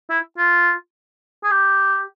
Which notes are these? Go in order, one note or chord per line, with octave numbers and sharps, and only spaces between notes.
E4
F4
G#4
G4